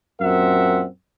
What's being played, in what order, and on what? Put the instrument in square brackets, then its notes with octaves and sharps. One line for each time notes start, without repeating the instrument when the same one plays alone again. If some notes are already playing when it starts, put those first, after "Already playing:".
[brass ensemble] F#2 A#2 C4 A#4 E5 F#5